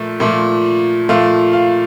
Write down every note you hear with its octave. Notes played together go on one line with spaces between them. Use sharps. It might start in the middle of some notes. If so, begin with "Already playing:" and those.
Already playing: A#2 F3 A3
A#2 F3 A3
A#2 F3 A3 F5
F5